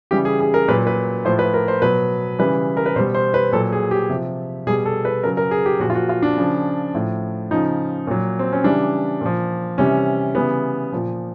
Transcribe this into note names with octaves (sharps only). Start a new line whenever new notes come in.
C#3 E3 G3 G4
G#4
G#4
A#4
A#2 F#3 B4
B4
A2 F3 C5
B4
A#4
C5
B2 F#3 B4
C#3 E3 G3 B4
A#4
B4
B2 G3 C5
C5
B4
A#2 F#3 A4
G#4
G4
C3 F3
B2 G3 G#4
A4
B4
C#3 F#3 A#4
A#4
G#4
G4
A#2 F3 F#4
F4
F#4
F4
D4
C#3 F3
A2 F3
C#3 F3 D#4
A#2 F#3
C4
C#4
C#3 E3 G3 D4
A#2 F3
C3 E3 G3 C#4
C#3 E3 G3 B3
A#2 F3